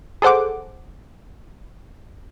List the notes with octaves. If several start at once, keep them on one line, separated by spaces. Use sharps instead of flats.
G#4 A4 C5 F#5 D6